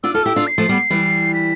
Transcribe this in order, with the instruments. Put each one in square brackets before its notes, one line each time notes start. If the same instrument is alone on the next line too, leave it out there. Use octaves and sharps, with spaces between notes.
[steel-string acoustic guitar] D4 F4 [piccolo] E6
[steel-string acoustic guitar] F4 A4 [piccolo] F6
[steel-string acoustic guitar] E4 G4 [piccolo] E6
[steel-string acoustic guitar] D4 F4
[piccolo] C7
[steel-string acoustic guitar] F3 A3
G3 B3
E3 G3
[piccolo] B6